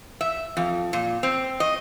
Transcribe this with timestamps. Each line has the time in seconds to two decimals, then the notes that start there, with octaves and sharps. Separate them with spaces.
0.21 E5
0.57 F2
0.93 A#2
1.23 C4
1.60 D#5